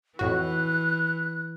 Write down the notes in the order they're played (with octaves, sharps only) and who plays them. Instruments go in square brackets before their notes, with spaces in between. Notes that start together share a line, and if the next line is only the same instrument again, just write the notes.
[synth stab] F2 A2 F#4 [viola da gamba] E3 [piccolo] F#6